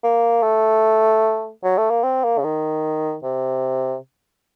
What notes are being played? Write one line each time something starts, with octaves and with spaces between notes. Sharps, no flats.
A#3
A3
F#3
A3
A#3
C4
A#3
C#3
D#3
C3